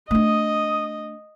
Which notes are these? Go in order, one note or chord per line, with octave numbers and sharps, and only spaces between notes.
A3 D4 D#5 D#6